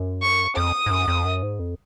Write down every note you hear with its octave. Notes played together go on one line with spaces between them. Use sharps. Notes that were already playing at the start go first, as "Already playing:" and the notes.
Already playing: F#2
C#6
F2 D#6
G#2
F#2
F2
F#2
G#2
F2